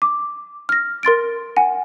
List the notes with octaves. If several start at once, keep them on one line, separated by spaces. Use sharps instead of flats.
D6
F6 A#6
A#4 C6 A6 D7
F#5 G#5